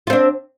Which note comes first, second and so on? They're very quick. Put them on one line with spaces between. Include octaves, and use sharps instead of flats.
F4 C4 D4